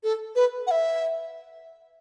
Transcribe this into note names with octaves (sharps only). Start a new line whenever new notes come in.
A4
B4
F#5
E5